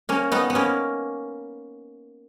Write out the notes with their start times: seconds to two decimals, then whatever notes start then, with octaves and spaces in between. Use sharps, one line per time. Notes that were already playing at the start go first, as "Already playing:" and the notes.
0.09 A#3 C#4
0.32 B3 D#4
0.50 B3
0.55 A#3 C#4